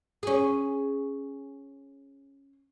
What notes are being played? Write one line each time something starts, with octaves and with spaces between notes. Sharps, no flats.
C#4 G#4